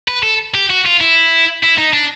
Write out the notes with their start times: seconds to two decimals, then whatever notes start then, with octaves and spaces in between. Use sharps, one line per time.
0.08 B4
0.23 A4
0.54 G4
0.70 F#4
0.86 F4
1.00 E4
1.63 E4
1.78 D#4
1.93 D4